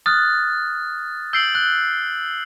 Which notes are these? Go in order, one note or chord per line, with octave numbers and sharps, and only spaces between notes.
D#6 F6 F#6 A6
E6 G6 C7 D7 F#7
F#6